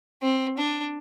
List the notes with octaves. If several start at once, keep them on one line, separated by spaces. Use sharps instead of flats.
C4
D4